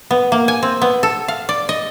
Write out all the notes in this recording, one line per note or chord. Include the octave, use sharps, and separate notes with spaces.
B3
A#3
G#5
C4
B3
A4
F5
D5
D#5